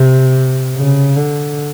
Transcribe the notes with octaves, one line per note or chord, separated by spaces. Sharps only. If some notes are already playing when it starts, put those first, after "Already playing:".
Already playing: C3
C#3
D3